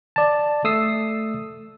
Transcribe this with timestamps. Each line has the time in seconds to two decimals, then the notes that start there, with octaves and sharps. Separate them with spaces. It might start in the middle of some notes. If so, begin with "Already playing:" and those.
0.16 D5 A5
0.64 A3 D#6 E6 C7